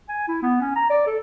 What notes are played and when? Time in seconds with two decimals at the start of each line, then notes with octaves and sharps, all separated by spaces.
0.09 G#5
0.28 E4
0.43 B3
0.61 C#4
0.76 A#5
0.90 D5
1.07 A4